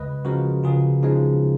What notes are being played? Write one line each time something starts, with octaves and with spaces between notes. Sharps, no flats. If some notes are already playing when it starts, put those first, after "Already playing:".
Already playing: C#2 B4 D#5
C#3 F3 G#3 F#4 A#4
C#2 F4 G#4
C#3 F3 G#3 D#4